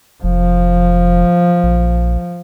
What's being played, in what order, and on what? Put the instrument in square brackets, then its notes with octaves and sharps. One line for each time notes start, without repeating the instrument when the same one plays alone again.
[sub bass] F1 [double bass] F3
[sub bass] A#1